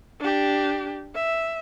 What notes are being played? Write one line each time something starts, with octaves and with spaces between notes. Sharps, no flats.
D4 G4
E5